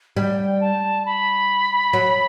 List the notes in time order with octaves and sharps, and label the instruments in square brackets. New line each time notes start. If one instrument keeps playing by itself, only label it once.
[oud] G3 [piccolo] G5
[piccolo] A5
B5
[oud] F#3